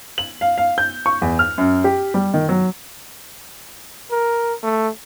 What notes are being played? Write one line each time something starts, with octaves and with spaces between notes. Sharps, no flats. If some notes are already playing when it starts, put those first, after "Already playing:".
F#7
F5
F5
G6
C#6
E2
F6
F#2
G4
G3
D#3
F#3
A#4
A3